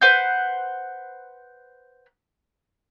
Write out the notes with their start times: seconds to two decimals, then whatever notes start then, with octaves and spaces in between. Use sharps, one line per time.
0.02 B4 C5 F#5 G6